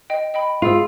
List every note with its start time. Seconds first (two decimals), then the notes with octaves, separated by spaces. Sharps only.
0.10 D#5 G5
0.34 D#5 G5 B5
0.62 F4 G#4 E6